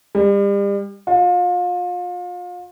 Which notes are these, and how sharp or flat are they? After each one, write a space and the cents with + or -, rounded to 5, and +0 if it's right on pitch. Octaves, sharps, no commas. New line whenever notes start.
G3 +35
F4 +35